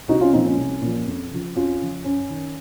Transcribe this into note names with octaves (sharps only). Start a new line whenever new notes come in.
C2 D#4 F#4
C#4 F4
A#2 F3 C4 D#4
C#4
C2
A#2 F3
F2
C#3 F3
F2 C#4 F4
C#3 F3
F#2 C#4
D#3